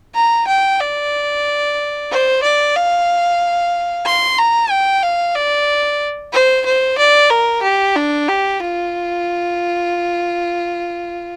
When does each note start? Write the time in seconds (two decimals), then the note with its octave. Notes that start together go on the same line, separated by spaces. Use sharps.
0.15 A#5
0.47 G5
0.80 D5
2.11 C5
2.43 D5
2.75 F5
4.06 C6
4.39 A#5
4.71 G5
5.03 F5
5.35 D5
6.33 C5
6.66 C5
6.98 D5
7.30 A#4
7.63 G4
7.96 D4
8.28 G4
8.61 F4